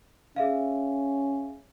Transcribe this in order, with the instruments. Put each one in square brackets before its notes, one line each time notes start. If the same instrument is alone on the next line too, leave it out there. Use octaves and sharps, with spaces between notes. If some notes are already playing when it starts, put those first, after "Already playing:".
[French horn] C#4 [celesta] G#4 E5 F5